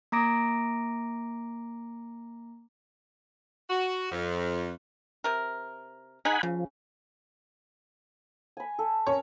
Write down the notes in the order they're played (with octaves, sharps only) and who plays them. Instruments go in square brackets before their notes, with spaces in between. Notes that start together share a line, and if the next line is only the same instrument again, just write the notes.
[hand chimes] A#3 A#5 D6 A#6 D7
[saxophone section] F#4
F2
[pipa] C3 A#4
[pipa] D#4 G#4 [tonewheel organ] F#5 G#5 B5
[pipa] C#3 [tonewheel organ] F3
[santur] G#5 B5
A4
[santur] C#4 A#4 [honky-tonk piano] C#5